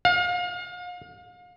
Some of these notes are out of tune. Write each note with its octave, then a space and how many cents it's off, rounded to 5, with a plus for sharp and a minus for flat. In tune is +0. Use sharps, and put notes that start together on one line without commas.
F5 +35